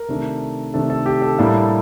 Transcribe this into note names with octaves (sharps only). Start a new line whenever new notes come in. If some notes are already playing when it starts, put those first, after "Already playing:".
Already playing: A#4
C3 D#3 A3 D4
C3 D#3 A3 D4 A4
A4
G4
A4
A2 G3 A#3 D4